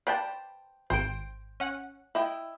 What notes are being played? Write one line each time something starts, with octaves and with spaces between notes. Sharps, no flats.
B4 C5 D5 G5 A5 B5
G#1 C5 G5 D7
C#4 F#5
E4 D#5 G5